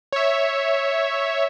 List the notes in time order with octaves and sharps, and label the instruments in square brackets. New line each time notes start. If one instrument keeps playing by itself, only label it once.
[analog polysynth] C#5 E5